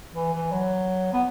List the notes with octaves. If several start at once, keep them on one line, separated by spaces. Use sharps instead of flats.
E3
E3
F#3
B3